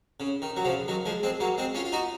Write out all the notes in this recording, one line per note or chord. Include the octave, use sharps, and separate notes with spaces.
C#3
D#3
F#3
C#3 F3
D#3 F#3
F3 G#3
G#3 C4
F#3 A#3
G#3 C4
C#4 F4
F4
D#4 F#4